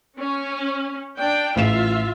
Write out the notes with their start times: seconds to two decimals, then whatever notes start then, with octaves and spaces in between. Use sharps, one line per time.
0.19 C#4
1.18 D4 G5
1.56 A1 F4 E5 F5 E7